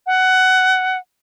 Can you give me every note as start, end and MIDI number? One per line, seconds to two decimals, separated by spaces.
0.07 0.98 78